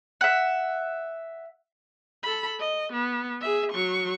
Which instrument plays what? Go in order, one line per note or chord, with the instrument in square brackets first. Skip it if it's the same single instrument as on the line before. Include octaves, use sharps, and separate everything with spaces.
[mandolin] E5 F#5
[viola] A4 B5
D#5
B3
G#4 E5
F#3 C#6